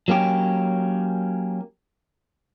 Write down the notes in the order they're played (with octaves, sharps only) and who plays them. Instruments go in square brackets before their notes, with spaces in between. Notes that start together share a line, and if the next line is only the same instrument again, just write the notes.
[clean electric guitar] F#3 A#3 C#4 G4